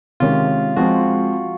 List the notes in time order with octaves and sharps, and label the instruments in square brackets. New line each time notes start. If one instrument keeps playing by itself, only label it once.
[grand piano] C3 D#3 G#3 C#4 [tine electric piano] F4
[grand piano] F3 G#3 C4 [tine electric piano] F#4